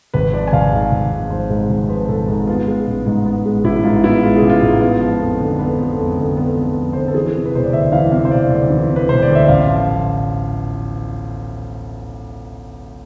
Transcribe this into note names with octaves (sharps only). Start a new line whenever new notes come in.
G#1 B4
F3 D5
G#5
G#1 F5
G#2
G#1
F3
G#1 C5
G#2
G#1
F3 B4
G#1 A4
G#2
B3 F4
G#3
A1
G#2
B3
G#3
A1 E4
G#2 F4
B3 E4
G#3 F4
G#4
A1
F4
G#2
B3 F4
F3
F2
D3
B3
F3
F2
D3
B3
F3
F2
D3 C5
B4
A4
E3 G#4
C3
B4
E1 C5
D5
D2 E5
E3 F5
C3 F5
C5
E1 D5
D2
E3
C3
B4
E1 C5
D5
D2
E5
A1 F5
F3